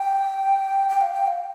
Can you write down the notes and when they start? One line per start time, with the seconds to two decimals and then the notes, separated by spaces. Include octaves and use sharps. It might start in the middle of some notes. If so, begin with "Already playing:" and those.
Already playing: G5
0.89 G5
1.01 F5
1.13 G5
1.27 F5